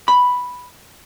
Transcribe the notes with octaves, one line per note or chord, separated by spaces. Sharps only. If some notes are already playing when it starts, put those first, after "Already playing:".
B5